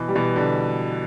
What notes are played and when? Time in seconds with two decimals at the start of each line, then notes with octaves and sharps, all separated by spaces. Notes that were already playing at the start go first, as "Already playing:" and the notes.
Already playing: B2 E3
0.08 G3
0.15 B2 E3
0.36 D3 G3